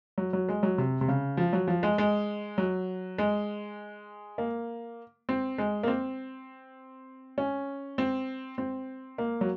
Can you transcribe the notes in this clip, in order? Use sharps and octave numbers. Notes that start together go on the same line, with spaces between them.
F#3
F#3
G#3
F#3
C3
C3
C#3
F3
F#3
F3
G#3
G#3
F#3
G#3
A#3
C4
G#3
A#3
C4
C#4
C4
C4
A#3
F#3